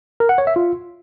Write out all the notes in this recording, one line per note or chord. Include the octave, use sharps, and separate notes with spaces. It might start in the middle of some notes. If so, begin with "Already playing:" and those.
A#4
F#5
C#5
E5
F4